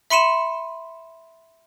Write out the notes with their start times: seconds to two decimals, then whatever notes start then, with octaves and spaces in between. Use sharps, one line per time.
0.10 E5 B5 C6 C#7 D#7 E7